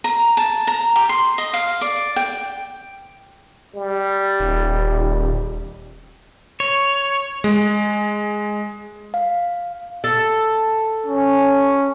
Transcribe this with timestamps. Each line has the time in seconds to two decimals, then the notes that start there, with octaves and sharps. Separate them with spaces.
0.04 A#5
0.37 A5
0.67 A#5
0.96 G4
1.09 C6
1.38 D#5
1.54 F5
1.81 D5
2.16 G5
3.75 G3
4.40 D#1
6.60 C#5
7.44 G#3
9.14 F5
10.04 A4
11.06 C#4